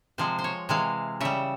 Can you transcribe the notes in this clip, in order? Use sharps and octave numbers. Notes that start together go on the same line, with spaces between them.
C3 F3 G#3 C5
C5
C#5
C3 E3 G#3 F5
C#3 G3 E5